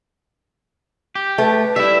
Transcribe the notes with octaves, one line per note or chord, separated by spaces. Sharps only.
G4
A3 B4
G3 E4 E5